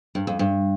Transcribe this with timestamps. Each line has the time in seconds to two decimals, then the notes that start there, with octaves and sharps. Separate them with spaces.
0.15 G2
0.27 F2
0.39 G2